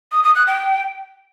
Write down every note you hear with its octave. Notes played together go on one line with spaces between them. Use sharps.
D#6
D#6
F#6
G5